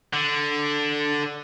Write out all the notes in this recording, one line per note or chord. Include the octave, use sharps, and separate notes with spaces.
D3